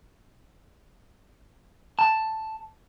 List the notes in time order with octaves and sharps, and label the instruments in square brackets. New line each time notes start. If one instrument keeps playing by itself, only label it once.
[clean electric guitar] A5